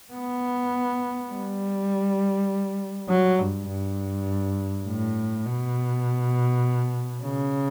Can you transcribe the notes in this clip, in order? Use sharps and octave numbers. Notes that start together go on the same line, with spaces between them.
B3
G3
F#3
G2
G2
A2
B2
C#3